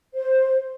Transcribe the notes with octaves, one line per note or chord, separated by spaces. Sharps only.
C5